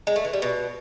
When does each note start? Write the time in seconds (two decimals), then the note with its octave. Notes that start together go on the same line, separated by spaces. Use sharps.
0.07 G#3
0.16 A3
0.25 E3
0.33 G3
0.42 B2